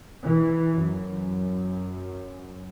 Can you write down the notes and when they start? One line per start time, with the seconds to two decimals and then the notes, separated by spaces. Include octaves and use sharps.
0.24 E3
0.78 F#2